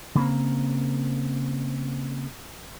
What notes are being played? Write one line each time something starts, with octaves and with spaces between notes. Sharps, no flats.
C#3 A#3 C4